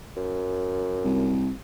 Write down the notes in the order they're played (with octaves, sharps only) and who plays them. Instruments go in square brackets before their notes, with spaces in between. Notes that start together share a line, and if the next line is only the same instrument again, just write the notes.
[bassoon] F#2
[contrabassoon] C2